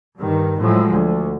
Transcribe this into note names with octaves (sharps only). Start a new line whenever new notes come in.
G2 D#3
A2 F3 F#3 G#3
D2